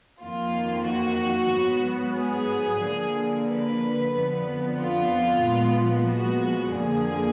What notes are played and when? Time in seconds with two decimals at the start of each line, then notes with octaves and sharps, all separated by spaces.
0.22 F2 D#3 A#3 F4
0.88 F#4
1.52 G#2 F#3 B3
2.18 G#4
2.82 D3 F3 A#3
3.48 B4
4.13 F2 D3 F3 B3
4.78 F4
5.43 A#2 F3 G#3 B3
6.09 F#4
6.73 F2 D3 F3 A#3 G#4